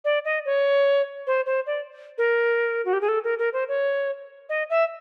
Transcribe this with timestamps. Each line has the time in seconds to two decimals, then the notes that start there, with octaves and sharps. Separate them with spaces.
0.05 D5
0.25 D#5
0.45 C#5
1.27 C5
1.46 C5
1.67 D5
2.18 A#4
2.85 F#4
2.93 G4
3.01 G#4
3.08 A4
3.24 A#4
3.39 A#4
3.53 C5
3.68 C#5
4.49 D#5
4.70 E5